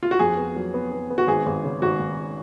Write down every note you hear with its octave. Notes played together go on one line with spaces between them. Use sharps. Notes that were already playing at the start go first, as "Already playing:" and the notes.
F4
F#4
F2 G#4
B3
F#3
B3
B3
B3
F#4
G#1 G#4
G#1
C#3
G#1 F#4
G#1